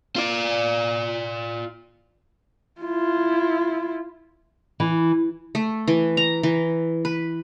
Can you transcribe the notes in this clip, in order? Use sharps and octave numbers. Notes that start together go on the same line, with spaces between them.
F4 D5
E4 F4
E3
A3
E3
A#5
E3
B4